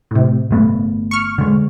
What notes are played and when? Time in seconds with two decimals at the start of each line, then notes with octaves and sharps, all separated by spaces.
0.11 A2 C3
0.51 G1 A3 B3
1.11 C#6 F6
1.38 D3 G#3